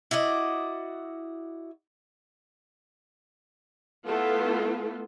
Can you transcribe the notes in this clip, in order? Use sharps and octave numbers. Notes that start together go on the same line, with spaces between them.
E4 F#4 D5 D#5
A3 B3 E4 F4 A4